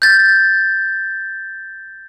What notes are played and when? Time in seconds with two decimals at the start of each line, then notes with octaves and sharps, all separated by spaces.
0.02 G6 A6